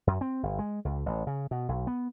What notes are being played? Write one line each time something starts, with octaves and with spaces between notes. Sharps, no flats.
F#2
C4
G1
G#3
C#2
A1
C#3
B2
B1
B3